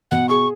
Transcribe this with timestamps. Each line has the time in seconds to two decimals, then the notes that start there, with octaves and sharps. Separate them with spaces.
0.11 B2 F#5
0.29 G#4 C#6